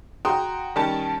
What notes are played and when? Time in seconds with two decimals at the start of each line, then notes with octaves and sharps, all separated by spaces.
0.25 F#4 G5 A#5 C6 D#6
0.76 D#3 G3 C#4 G5 A5